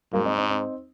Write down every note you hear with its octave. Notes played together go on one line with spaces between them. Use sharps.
G#2 F#3 A#3
C4 D#4
C4 D#4
C4 D#4